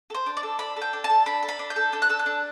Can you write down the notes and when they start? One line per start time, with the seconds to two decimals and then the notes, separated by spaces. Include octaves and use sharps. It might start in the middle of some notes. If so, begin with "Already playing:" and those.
0.10 A4
0.15 C5
0.26 D4
0.37 D5
0.43 A4
0.59 D4 B5
0.76 A4
0.82 G5
0.93 D4
1.04 A5
1.10 A4
1.26 D4 B5
1.43 A4
1.48 B5
1.59 D4
1.70 G6
1.76 A4
1.93 D4 G6
2.02 F#6
2.09 A4 E6
2.19 F#6
2.26 D4